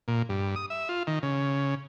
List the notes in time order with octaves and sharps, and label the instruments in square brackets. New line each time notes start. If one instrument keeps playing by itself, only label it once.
[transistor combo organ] A#2
G2
D#6
E5
F4
D#3
C#3